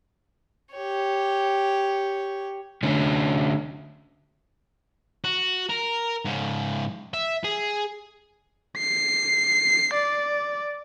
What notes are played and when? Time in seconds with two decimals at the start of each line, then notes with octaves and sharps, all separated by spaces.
0.72 G4 C#5
2.83 D3 A3 C#4
5.24 F#4
5.69 A#4
6.25 G#2 C#3
7.14 E5
7.44 G#4
8.78 C7
9.95 D5